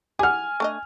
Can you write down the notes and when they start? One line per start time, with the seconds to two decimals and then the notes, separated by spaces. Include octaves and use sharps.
0.19 G4 F#5 G#5 F6
0.60 A3 D4 D#5